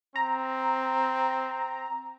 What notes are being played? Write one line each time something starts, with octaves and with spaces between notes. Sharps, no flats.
C4 A#5